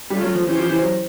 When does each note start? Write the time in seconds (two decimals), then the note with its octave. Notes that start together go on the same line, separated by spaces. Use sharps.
0.10 G3 A3 C#4 F4
0.22 F#3
0.34 F3
0.46 E3 C#4 E4 G4 C5
0.58 F3
0.69 E3
0.81 F#3